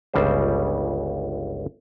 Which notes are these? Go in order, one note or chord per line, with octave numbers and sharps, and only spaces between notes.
G1 C#2 C#3 G3 C5